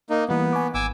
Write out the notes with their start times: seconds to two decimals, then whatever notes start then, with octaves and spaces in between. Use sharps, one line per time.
0.10 A#3 D#4
0.29 E3 G3 A#3 B3
0.53 G#5 C#6 D6
0.74 G#1 G#5 D6 E6